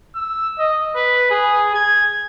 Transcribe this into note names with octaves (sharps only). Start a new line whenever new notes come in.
E6
D#5
B4
G#4
G#6